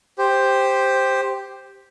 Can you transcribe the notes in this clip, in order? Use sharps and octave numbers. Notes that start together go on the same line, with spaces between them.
G4 C5